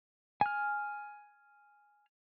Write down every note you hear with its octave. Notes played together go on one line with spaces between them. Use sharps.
G#5 F6